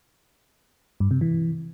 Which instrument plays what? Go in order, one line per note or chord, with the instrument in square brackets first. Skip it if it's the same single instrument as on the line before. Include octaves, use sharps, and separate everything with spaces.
[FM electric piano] G2
C3
E3